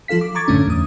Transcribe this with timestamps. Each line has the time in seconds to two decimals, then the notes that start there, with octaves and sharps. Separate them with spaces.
0.08 F3 F4 A4 F5 B6
0.21 D6
0.35 A#5 C#6 D6 G#6 A6
0.48 F#2 A2 D3 A3 C#4 D4
0.67 E2 D#6